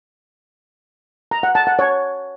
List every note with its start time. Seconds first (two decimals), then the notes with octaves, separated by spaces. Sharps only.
1.31 A#5
1.43 F#5
1.55 A5
1.67 F#5
1.79 C#5